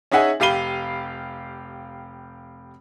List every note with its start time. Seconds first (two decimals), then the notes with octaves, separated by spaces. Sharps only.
0.11 C#4 D#4 G#4 E5 F#5 G#5
0.40 F1 G4 F5 B5 D#7 G7